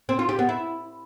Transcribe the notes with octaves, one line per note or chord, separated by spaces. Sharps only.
C4
F4
G4
B3
E4